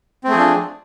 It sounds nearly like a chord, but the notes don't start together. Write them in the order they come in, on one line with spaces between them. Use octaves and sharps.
C4 A3 G#4 F3 D4